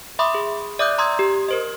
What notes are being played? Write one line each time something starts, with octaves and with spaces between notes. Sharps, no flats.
E5 B5 C6 D6 D#6
G#4
D5 E5 D6 D#6 F#6 G6
A#5 C6 D#6 E6 G#6
G4
A#4 C5 D#5